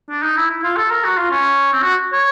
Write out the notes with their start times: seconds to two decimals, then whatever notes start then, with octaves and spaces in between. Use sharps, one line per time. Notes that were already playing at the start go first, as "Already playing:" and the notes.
0.10 D4
0.23 D#4
0.37 E4
0.50 E4
0.64 F4
0.77 A4
0.90 A#4
1.04 F#4
1.17 F4
1.31 C#4
1.72 C4
1.83 F#4
2.13 C#5